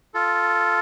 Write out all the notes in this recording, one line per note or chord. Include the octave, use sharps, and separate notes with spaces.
F4 A4